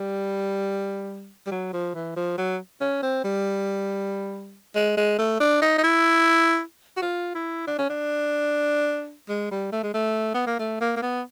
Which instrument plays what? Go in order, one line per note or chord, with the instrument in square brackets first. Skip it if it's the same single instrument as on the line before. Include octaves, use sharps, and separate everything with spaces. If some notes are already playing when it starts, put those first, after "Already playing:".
Already playing: [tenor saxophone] G3
G3
F#3
F3
E3
F3
F#3
C#4
C4
G3
G#3
G#3
A3
D4
D#4
D#4
E4
F#4
F4
E4
D4
C#4
D4
G#3
G3
A3
G#3
A3
B3
A#3
A3
A#3
A#3
B3